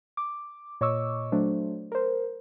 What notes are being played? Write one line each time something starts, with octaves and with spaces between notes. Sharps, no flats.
D6
A#2 C#5 D#5 C#6 D6 E6
F#3 A3 D4 C5
A#4 C5